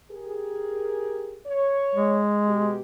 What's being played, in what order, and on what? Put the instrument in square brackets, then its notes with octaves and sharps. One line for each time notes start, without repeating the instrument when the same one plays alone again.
[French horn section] G4 G#4 A#4
C#5
[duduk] G#3
[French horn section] B2 G4 G#4